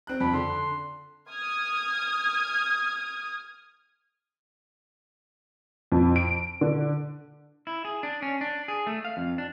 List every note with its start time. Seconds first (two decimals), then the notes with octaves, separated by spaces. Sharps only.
0.07 C4 F#6
0.20 F2 B5
0.33 D3 C6
1.30 D#6 F6 G#6
5.92 F2
6.16 D7
6.61 D3
7.67 E4
7.85 G#4
8.03 D4
8.22 C#4
8.41 D4
8.68 G#4
8.87 A3
9.05 F5
9.17 F2
9.38 D4